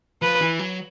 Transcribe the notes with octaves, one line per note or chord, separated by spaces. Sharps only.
F3 B4
E3
F#3